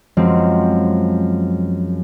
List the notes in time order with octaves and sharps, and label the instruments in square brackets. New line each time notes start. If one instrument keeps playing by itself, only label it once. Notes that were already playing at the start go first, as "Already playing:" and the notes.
[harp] F#2 F3 G#3 C4